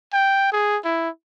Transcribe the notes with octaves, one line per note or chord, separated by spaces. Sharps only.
G5
G#4
E4